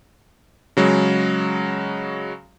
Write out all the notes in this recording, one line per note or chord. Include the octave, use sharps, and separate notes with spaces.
C#3 F#3 G#3